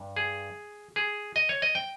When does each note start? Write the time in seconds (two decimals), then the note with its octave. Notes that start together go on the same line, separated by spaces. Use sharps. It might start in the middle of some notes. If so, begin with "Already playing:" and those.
Already playing: G2
0.16 G#4
0.96 G#4
1.36 D#5
1.49 C#5
1.62 D#5
1.75 G5